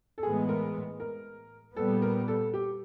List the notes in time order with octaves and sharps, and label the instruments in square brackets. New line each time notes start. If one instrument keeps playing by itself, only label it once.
[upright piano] A4
[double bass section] A2 E3 G#3 B3 [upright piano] G#4
[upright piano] A#4
A#4
[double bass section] A#2 G3 B3 [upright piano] A4
[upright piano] A#4
A4
G4